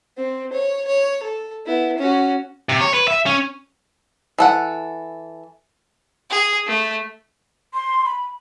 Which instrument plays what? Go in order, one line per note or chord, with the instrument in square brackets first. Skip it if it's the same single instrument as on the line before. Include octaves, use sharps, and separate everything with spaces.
[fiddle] C4
C#5
C#5
A4
B3 E4
C#4 F#4
[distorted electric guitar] C3
C#5
B4
E5
C#4
[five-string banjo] E3 A4 F#5
[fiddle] G#4
A3
[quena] C6
B5